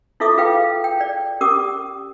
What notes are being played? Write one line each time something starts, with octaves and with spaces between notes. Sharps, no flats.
E4 F4 A4 E5 D6 D#6
F4 G#4 B4 F5 G5
G5
D5
C#4 G4 A#4 D6 D#6